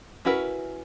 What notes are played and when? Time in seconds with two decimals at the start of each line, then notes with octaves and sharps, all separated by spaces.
0.25 C#4 E4 F#4 A#4 B4